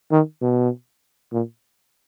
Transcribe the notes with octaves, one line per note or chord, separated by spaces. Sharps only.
D#3
B2
A#2